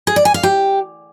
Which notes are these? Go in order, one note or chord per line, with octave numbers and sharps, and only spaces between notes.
G#4
D5
G#5
F5
G4